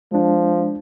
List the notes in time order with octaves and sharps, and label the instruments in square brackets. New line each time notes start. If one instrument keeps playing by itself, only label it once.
[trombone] F3 [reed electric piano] G#3 D4